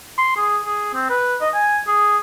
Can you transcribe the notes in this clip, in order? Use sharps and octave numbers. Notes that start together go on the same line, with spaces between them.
C6
G#4
G#4
C4
B4
D#5
G#5
G#4